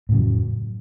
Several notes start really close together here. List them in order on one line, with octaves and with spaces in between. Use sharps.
A2 C#3 F#3 F2